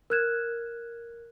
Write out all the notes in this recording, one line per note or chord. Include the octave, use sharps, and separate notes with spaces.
A#4 F6 F#6 G#6 E7